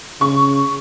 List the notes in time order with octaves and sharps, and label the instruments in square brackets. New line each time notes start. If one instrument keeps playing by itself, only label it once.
[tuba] C#3 [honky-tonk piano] C#6